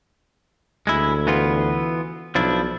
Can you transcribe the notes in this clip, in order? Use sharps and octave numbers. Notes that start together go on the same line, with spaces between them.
D2 G#3 E4
E3 B3 F4
B1 F3 D4 E4